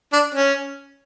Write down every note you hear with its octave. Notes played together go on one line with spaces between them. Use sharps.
D4
C#4